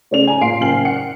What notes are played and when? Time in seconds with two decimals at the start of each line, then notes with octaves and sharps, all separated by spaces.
0.11 C#3 A3 C#4 D5 F7
0.27 G#5 A#5
0.41 A#2 F5 C6 C7 D7
0.61 F#1 G5 G#5 F6 C7 F#7
0.85 F#5 C#7